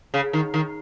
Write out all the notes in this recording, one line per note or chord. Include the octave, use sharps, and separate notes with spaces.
C#3
D#3
D#3